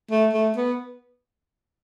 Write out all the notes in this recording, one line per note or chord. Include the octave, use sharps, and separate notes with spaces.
A3
A3
B3